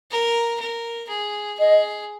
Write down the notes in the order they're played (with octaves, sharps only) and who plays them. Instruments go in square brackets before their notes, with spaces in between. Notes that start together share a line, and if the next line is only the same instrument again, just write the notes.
[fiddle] A#4
A#4
G#4
[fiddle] G#4 [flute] D#5